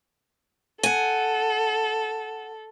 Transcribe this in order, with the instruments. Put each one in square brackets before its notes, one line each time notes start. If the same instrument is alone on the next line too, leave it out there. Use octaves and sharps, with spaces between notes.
[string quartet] A4 [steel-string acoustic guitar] F#5 G#5